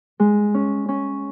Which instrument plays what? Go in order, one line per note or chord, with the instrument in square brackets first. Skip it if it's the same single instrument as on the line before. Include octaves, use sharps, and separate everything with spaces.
[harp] G#3
C#4
C#4